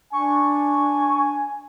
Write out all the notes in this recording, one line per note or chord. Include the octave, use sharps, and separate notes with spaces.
D4 G#5 C#6